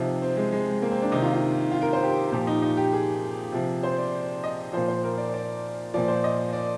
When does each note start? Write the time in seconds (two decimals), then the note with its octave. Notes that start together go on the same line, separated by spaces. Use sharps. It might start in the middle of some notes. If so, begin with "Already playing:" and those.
Already playing: C3 F3 D#4
0.22 C4
0.37 G#3
0.52 G#3
0.82 A#3
0.91 C4
1.02 D4
1.12 C3 D#3 D#4
1.22 F4
1.33 F4
1.72 F4
1.82 A#4
1.93 C5
2.03 G4
2.32 A#2 F3 G4
2.47 D#4
2.62 D#4
2.77 G4
2.93 G#4
3.52 C3 F3
3.83 C5
3.98 D5
4.44 D#5
4.73 A#2 F3 C5
4.88 C5
5.04 A#4
5.18 D5
5.34 D5
5.94 A#2 F3 D5
6.08 C5
6.24 D#5
6.53 D5